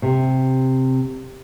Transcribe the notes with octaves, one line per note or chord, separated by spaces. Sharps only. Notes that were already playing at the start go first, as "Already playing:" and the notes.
C3